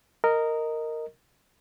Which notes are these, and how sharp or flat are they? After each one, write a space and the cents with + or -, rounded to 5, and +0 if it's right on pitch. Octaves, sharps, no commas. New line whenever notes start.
A#4 -10 D#5 +0